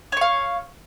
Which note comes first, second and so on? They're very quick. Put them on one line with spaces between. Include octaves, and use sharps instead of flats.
C#5 C#6 F5